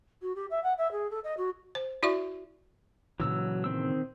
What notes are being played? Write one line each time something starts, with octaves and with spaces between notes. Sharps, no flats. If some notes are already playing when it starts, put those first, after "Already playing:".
F#4
G4
E5
F#5
E5
G#4
A4
D#5
F#4
C5
E4 F#4 D5 E5 C#6
A#2 C#3 E3 F#3 E6
D#3 C4 E6